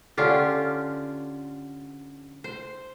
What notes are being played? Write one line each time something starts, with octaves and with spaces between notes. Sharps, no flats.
D3 C#4 F4 G4
C5